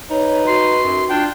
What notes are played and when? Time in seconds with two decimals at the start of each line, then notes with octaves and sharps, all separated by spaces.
0.10 D#4 B4 C#5
0.47 F#4 C6
0.84 F#2
1.10 D4 F4 G5